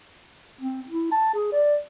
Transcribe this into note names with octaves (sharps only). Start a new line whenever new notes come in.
C4
E4
A5
G#4
D5